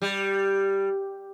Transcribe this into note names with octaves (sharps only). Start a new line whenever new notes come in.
G3